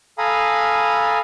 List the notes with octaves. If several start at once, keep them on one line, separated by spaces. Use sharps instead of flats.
A4 F5 G#5 A#5 B5 D#6